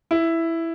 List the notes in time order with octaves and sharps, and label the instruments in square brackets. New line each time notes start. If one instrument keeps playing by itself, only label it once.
[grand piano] E4